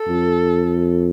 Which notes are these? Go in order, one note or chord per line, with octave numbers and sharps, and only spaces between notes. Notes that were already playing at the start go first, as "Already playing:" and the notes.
Already playing: A4
F2